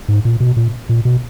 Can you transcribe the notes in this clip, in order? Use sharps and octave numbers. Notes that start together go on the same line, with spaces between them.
G#2
A#2
B2
A#2
A#2
B2